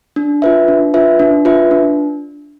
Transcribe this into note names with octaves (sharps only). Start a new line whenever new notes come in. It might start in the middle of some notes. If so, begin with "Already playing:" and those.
D4
F4 B4 E5
D4
F4 B4 E5
D4
F4 B4 E5
D4